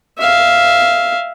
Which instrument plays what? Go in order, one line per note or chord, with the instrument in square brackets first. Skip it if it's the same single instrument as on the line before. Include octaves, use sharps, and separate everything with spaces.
[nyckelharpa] E5 F5